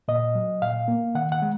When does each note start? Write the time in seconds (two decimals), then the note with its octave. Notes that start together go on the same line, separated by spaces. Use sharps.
0.08 A#2 D#5
0.35 F#3
0.62 A#2 F5
0.88 A#3
1.15 D#3 F#5
1.32 F#5
1.42 G#3